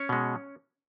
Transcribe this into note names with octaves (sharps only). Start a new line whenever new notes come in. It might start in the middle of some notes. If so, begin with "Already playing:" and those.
Already playing: C#4 C#5
B2 G#3